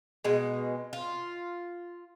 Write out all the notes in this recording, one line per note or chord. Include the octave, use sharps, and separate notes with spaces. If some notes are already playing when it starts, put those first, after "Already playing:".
B2 G#3
F4